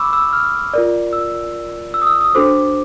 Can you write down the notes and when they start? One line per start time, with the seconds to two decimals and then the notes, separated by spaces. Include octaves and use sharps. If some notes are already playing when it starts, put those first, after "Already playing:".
Already playing: B5 C#6 D6 E6
0.13 E6
0.33 F6
0.74 F4 A#4 D5
1.13 E6
1.94 E6
2.02 D#6
2.07 E6
2.21 D#6
2.35 D4 F#4 A4 C5 D6